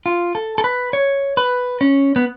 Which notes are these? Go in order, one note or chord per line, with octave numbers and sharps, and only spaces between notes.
F4
A4
A4
B4
C#5
B4
C#4
B3